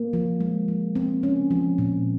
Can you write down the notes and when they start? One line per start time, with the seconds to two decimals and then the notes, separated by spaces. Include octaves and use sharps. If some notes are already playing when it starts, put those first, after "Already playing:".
Already playing: A#3
0.13 F3
0.40 G#3
0.68 F3
0.95 C4
1.23 C#4
1.51 F3
1.78 A#2